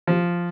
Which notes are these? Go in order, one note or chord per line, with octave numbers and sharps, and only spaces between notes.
F3